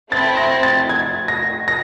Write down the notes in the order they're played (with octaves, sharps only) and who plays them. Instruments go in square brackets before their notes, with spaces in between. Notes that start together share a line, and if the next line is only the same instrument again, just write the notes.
[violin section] A3 C4 E4 [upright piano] A6
[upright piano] A#6
A6
G#6
A#6
A#6